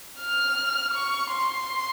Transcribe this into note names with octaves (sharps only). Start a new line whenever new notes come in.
F6
C#6
C6